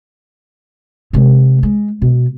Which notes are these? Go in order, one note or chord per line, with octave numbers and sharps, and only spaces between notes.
C3 G#3
G#3
B2